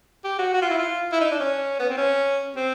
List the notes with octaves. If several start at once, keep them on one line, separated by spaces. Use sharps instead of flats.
G4
F#4
F#4
F4
E4
F4
E4
D#4
D4
C#4
B3
C4
C#4
C4